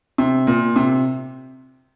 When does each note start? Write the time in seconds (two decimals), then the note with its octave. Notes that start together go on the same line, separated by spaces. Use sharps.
0.18 C3
0.47 A#2
0.76 C3